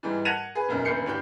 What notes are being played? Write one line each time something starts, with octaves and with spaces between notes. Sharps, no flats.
G#2 E3 G3
F#5 A5 G#6 A#6 D#7 F7
G#4 B4
E1 B1 F#2 A#4
D#1 D2 B4 G6 C7 C#7
G2 D4 G4 G6